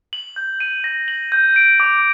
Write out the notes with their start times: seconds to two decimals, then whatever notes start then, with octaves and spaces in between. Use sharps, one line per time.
0.13 F#7
0.36 G6
0.60 D#7
0.84 A#6
1.08 F#7
1.32 G6
1.56 D7
1.80 D6